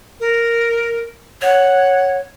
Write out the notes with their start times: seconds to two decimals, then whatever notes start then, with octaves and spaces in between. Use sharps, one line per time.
0.20 A#4
1.42 C#5 F#5